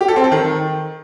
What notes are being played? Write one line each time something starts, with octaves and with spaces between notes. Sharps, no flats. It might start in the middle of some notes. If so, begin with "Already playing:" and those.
G4
A4
C4
A4
D#3